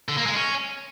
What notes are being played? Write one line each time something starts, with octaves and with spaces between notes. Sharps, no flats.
D3
A#3
G#3
C#4